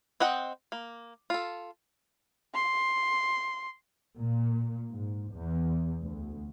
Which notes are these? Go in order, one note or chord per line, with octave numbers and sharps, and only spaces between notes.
C4 D#5 F#5 G5
A#3
F4 A4
C6
A#2
G#2
E2
D2